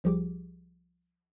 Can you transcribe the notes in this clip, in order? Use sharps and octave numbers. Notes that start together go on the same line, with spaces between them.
C2 F3 G3 G4 G#4 D6